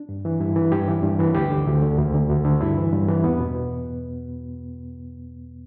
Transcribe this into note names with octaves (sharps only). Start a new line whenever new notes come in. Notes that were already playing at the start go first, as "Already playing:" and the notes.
Already playing: D4
G2
E3
G2 E4
E3
G2 G4
E3
G2
E3
D2 G4
D3
D2
D3
D2
D3
D2
D3
G2 E4
E3
G2
E3
E2 B3
B2